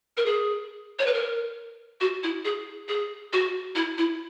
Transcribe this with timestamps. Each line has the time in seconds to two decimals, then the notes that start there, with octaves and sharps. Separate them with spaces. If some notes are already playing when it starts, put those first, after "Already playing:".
0.17 A#4
0.26 G#4
0.99 C#5
1.06 B4
1.14 A#4
2.01 F#4
2.23 E4
2.45 G#4
2.88 G#4
3.33 F#4
3.75 E4
3.98 E4